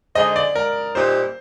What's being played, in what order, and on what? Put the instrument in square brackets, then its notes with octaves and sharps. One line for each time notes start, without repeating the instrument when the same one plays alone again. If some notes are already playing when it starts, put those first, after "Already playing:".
[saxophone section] D3 G#3 D#4 G#4 C5 [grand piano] D#5
[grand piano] D5
A#4
[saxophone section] A#2 G3 C4 D#4 G4 [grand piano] C5